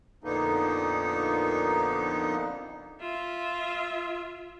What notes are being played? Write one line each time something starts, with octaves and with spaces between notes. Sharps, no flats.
F2 A#2 D3 A#3 B3 D#4
F4 E5